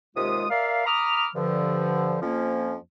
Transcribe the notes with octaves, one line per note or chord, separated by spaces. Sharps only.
D#2 C3 G#3 F4 D#6
A#4 D5 E5 F5
A#5 B5 D6 D#6 F6
G2 D3 F3
F2 F3 A#3 C#4